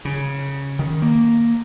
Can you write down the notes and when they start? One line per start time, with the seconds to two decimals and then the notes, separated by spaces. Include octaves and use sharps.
0.05 C#3
0.79 D#3
1.02 A#3